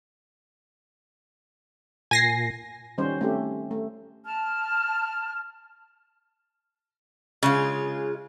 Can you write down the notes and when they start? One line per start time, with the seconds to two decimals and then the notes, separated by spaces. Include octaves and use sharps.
2.11 A#2 G#5 A#6 C7
2.98 D#3 G3 C#4 C5
3.21 A3 C4 C#4 G4
3.71 A3
4.24 A5 F6
7.43 C#3 G#3 F4